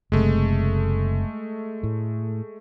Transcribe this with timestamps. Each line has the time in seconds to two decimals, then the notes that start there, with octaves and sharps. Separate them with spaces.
0.12 F#1 C3 G#3 A3
1.83 A2